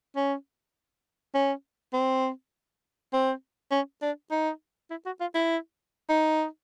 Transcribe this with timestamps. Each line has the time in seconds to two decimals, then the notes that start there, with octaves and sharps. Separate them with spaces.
0.16 C#4
1.35 C#4
1.94 C4
3.13 C4
3.72 C#4
4.02 D4
4.32 D#4
4.91 E4
5.06 F#4
5.21 F4
5.35 E4
6.09 D#4